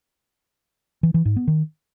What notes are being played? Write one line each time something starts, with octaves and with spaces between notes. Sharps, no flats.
E3
E3
G#2
B3
D#3